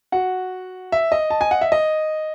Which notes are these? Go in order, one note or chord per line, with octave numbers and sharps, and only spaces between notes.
F#4 F#5
E5
D#5
A5
G#5
F#5
E5
D#5